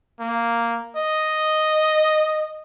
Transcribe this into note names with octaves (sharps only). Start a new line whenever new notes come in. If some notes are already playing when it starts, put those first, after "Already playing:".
A#3
D#5